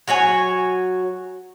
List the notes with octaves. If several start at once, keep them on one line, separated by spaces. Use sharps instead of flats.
F#3 F#4 C#5 G#5